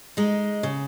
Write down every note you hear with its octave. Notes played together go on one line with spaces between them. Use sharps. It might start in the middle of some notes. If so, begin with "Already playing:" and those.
G#3 D#4
C#3